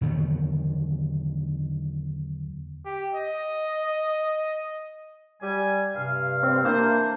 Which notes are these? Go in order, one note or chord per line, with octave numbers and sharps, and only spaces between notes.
E2 D3 D#3 F#3
G4
D#5
G3 G#5
G2 C3 F5
C4
E3 A#3 D4 C5